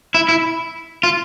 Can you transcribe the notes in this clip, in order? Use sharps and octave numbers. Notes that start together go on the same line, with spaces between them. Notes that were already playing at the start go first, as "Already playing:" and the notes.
E4
E4
F4